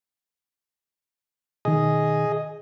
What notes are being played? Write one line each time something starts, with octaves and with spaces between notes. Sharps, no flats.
B2 D#3 G#4 D#5